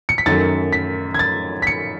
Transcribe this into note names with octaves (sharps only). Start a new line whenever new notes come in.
C#7
B6
F#2 D#3 F#3 A3 A6
B6
G#6
A6
B6
C#7